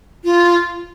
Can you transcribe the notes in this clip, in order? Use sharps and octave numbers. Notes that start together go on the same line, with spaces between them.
F4